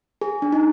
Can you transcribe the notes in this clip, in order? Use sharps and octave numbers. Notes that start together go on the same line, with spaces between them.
G#4
D4
D#4